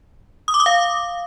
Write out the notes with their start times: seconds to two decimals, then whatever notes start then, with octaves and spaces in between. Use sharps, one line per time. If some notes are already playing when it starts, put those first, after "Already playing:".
0.48 D#6
0.54 D6
0.60 D#6
0.66 F5